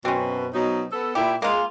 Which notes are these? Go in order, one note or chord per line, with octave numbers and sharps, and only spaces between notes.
F#2 B2 C4 C#4
B2 F#3 D#4
B3 A4
A#2 E4 G4
G#3 A#3 F4